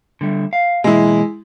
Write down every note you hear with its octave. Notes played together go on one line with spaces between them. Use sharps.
D3 G3 A3
F5
B2 E3 G#3 A#3 E4